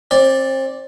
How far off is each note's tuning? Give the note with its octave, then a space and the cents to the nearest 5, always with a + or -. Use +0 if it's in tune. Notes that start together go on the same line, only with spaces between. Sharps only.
C4 +35 D5 +0